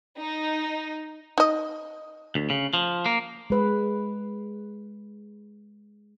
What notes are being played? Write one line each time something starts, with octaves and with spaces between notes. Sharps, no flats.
D#4
D#4 D#5
D2
C#3
F3
A#3
G#3 B4